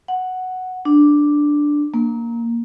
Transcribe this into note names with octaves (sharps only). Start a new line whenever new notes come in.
F#5
D4
A#3